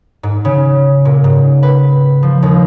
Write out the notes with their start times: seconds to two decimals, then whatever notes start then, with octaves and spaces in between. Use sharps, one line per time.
0.23 G#2
0.45 C#3
1.05 A#2
1.24 G#2
1.63 B4
2.23 F3
2.42 D#2